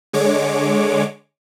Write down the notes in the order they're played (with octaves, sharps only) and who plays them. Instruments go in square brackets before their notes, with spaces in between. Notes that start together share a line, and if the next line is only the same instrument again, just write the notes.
[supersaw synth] D3 G#3 C#5 D6